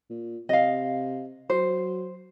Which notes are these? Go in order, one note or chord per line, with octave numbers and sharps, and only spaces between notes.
A#2
C3 D#5 F5
F#3 C5